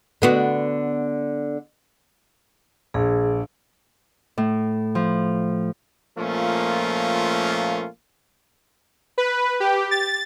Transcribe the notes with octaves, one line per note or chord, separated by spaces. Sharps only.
D3 B3 F#4
A#1 G#4
A2
F3
A#2 F3 A3 A#3 C#4 F4
B4
G4
A6